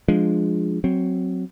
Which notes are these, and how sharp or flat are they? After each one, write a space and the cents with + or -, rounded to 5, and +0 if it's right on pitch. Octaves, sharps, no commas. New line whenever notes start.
F3 +0 G#3 +0 D4 +0
F#3 +5 C4 +0